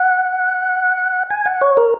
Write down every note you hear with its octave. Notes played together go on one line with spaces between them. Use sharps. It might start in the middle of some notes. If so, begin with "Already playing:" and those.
Already playing: F#5
G#5
F#5
C#5
A#4